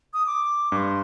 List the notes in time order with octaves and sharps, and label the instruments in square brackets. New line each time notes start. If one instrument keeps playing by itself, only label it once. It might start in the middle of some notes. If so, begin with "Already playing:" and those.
[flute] D#6
D6
[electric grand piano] G2 [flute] D6
[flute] C6